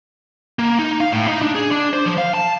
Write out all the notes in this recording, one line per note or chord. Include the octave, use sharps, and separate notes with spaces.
A#3
D#4
F5
A2
D#4
D4
G#4
D4
C5
F3
F5
A5